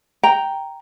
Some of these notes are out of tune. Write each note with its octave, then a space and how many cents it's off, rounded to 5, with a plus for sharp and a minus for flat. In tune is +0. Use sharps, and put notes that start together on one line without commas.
G5 +0 A#5 +0